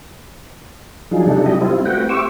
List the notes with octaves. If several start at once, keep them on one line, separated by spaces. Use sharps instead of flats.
F3 F#3 D4 D#4 F4 G#4
C3 G3 D4 D#4 A4
F#3 E4 G4 D#5
G3 C4 E4 F4
A3 C4 F#4 B4 F#5 G5
G4 C5 E5 C#6 D6 E6